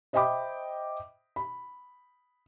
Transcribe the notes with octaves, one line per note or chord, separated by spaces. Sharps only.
C5 D#5 E5 G5 B5 D6
B5